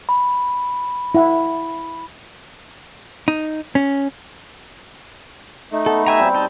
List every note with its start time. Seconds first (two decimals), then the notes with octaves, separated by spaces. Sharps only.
0.09 B5
1.15 E4 F#5
3.28 D#4
3.75 C#4
5.72 A3 D#4
5.86 B3 A4
6.06 G4 E5 G#5 A#5 C#6
6.20 G3 C4
6.35 D#4 A5 G6